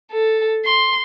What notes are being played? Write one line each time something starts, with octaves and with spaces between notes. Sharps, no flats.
A4
C6